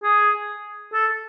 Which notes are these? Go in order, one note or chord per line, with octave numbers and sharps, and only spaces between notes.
G#4
A4